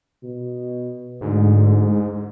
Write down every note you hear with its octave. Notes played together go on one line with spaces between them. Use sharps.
B2
D2 G#2